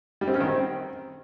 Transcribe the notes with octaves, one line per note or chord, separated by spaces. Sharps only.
G3
C4
C#4
D#3
C4